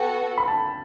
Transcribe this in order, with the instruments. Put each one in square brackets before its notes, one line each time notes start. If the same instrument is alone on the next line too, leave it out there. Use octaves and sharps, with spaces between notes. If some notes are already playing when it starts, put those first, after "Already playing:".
Already playing: [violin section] B3 F#4 A4 [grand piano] G5
[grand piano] B5
A5